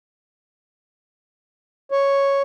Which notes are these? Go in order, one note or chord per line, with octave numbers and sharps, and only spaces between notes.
C#5